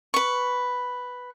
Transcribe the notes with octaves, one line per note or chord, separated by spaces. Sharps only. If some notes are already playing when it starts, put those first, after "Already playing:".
B4 C#6